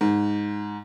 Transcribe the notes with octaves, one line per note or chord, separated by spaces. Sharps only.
G#2